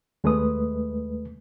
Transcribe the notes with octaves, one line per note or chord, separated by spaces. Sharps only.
D#2 G#3 A3 B4 D#6